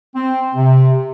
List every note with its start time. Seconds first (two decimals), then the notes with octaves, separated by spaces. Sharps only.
0.16 C4
0.55 C3